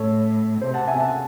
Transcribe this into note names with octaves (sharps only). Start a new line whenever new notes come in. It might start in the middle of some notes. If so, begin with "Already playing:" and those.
Already playing: A2 A4 C#5
C3 C5
F#5 A5
E5 G#5
F#5 A5